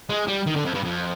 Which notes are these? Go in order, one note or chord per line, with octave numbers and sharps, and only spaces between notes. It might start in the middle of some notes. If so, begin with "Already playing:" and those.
G#3
G3
D#3
D3
F2
G2
F2